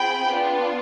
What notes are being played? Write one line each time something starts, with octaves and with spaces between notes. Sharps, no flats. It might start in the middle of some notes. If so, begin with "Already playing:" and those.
Already playing: C4 F4 G#4 G5 B5
B3 D4 F4